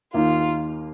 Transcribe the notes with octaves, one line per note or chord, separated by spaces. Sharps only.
D#2 D#3 A#3 D#4 F4